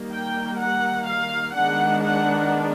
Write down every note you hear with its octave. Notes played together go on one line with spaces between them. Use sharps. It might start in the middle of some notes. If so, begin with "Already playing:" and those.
Already playing: D#3 G3 A#3
G5
F#5
F5
D#3 G#3 B3 D4 F#5
F#5